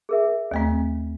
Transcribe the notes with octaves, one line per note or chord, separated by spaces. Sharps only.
G#4 A#4 E5
D#2 A3 C4